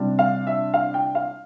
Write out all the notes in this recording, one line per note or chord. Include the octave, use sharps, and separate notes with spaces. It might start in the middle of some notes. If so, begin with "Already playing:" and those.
Already playing: C3 G3 D4
F5
E5
F5
G5
F5